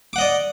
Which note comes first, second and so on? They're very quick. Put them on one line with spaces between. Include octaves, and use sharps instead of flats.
D6 F#5 D#5 D5